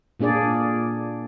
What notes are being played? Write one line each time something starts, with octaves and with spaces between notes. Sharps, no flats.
A#2 A#3 D4 G#4 D5